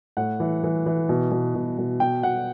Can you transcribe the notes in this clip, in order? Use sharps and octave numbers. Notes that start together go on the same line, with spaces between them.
A2 F#5
E3
E3
E3
B2
B2
B2
B2
B2 G5
B2 F#5